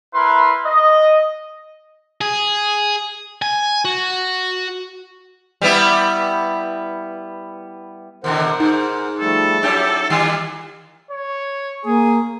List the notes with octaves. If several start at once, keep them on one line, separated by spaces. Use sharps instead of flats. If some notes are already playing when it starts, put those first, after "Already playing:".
E4 A#4 B4 C6
D#5
G#4
G#5
F#4
G3 B3 E4
D#2 B2 D3 A#4 C5 F#5
G#2 D#4
F3 G3 A3 A4
F#3 C#4 E4 G4
D#3 G3 A#3 F4
C#5
A#3 G#4